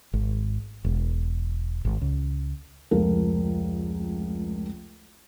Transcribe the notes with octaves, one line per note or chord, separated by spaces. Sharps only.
G#1
E1
G#1
C#2
F1 C#2 F3 A#4